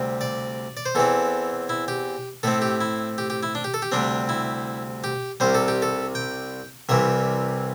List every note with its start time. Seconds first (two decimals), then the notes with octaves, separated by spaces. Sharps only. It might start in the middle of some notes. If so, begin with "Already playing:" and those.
Already playing: D2 C3 G3 C4
0.21 D5
0.77 D5
0.86 C5
0.95 E2 E3 C4 A4
1.69 E4
1.88 G4
2.43 A2 A3 C4 A4
2.62 G4
2.81 E4
3.18 G4
3.30 G4
3.43 E4
3.55 D4
3.64 G4
3.74 A4
3.82 G4
3.92 D2 C3 G3 C4 D4
4.29 E4
5.04 G4
5.40 C2 C3 G3 C5
5.55 A4
5.68 G4
5.82 A4
6.15 G5
6.89 C2 C3 E3 G3 E5